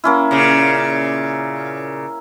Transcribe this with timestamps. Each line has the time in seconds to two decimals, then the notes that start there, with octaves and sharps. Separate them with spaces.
0.04 A#3 C#4 E4
0.31 A#2 C#3